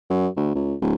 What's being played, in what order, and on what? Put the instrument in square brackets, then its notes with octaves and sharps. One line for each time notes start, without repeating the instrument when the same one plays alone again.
[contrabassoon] F#2
D2
C#2
D1